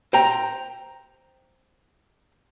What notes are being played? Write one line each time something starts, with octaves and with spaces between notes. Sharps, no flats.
C5 G5 A#5